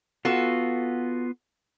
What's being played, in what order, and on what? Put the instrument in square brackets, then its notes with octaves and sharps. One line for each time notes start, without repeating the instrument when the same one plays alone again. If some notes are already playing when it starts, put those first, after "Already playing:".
[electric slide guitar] B3 F4 [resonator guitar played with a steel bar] F#4 A4